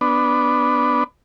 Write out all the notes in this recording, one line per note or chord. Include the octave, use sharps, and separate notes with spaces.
B3 D4